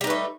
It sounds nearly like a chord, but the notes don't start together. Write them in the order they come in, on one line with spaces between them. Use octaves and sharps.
G3 D#4 B4 A3